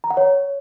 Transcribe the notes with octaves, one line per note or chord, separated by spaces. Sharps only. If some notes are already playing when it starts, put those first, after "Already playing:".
A#5
F#5
C#5